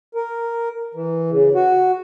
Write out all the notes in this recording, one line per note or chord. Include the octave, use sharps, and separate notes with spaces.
A#4
E3
C#3
F#4